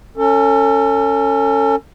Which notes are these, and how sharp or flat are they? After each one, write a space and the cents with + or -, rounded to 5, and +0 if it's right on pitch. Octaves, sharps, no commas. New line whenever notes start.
C#4 +0 A4 +35